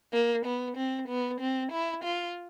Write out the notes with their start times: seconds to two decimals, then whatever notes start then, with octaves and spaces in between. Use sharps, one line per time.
0.13 A#3
0.46 B3
0.77 C4
1.08 B3
1.41 C4
1.72 E4
2.04 F4